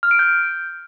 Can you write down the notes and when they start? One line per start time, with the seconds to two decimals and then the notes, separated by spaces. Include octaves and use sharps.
0.03 F6
0.11 D7
0.19 G6